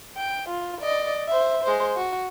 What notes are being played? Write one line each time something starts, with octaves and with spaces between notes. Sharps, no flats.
G5
F4
D5 D#5
C5 E5
G#3 C5
F#4